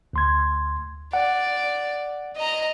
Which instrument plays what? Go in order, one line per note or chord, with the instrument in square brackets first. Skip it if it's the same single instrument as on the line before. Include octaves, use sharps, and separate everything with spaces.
[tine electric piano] D2 C6 G#6
[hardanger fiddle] D5 [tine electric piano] F#5
[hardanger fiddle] D#5 A#5